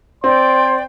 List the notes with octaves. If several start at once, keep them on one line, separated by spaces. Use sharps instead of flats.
C4 C5 D5 G5 C6